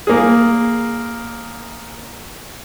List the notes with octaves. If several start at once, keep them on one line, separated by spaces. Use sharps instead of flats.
A#3 G#4